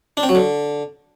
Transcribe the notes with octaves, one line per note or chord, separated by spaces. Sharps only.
D4
C4
F#3
D3